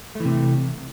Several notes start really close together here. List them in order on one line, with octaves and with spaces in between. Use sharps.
A3 E3 C3